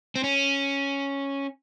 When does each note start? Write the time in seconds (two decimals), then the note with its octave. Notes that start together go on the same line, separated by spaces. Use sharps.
0.16 C4
0.24 C#4